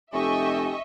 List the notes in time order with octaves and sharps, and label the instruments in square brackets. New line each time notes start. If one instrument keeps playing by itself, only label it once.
[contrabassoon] F1 [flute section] G4 A4 G#5 [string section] D#5 E5 C#6